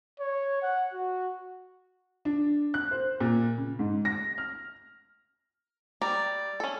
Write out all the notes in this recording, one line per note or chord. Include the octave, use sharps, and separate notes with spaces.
C#5
F#5
F#4
D4
F#6
C5
A#2
C#3
G#2
A#6
F6
G3 D5 A#5
C#4 A4